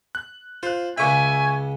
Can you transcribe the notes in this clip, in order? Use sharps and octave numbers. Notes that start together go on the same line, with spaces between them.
F#6
F4 C5 F#6
C#2 C#3 E5 G#5 B5 C#6 D6